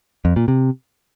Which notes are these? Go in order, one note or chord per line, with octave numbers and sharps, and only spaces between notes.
F2
A#2
C3